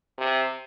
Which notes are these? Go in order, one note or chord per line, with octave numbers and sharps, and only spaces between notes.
C3